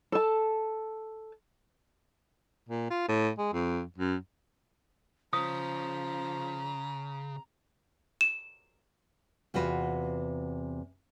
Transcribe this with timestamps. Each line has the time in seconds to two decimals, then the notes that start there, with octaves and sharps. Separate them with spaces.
0.12 A4 A5
2.69 A#2
2.90 F4
3.08 A2
3.38 G#3
3.53 F2
3.98 F#2
5.33 C#3 F3 A#5 D#6
8.21 E7
9.54 E2 C3 F4 F#4 B4